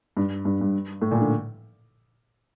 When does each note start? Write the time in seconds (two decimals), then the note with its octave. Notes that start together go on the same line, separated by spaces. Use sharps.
0.17 G2
0.45 G2
0.61 G2
1.02 A2
1.11 A#2
1.20 D3